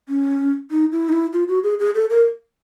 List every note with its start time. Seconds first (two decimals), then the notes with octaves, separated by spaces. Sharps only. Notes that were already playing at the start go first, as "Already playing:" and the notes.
0.09 C#4
0.71 D#4
0.92 E4
1.09 D#4
1.12 E4
1.33 F4
1.48 F#4
1.64 G#4
1.80 G#4
1.95 A4
2.10 A#4